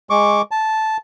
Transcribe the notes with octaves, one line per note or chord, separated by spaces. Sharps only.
G#3 C#6 D6
A5